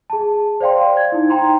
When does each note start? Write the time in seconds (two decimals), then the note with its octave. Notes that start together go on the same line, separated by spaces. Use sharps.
0.10 G#4 A5
0.60 C5 D5 F5 G5 C6
0.97 G#6
1.12 D#4 E4
1.30 G5 A#5 C6